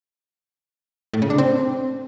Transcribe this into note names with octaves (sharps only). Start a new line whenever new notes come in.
A2
C#3
D4
C4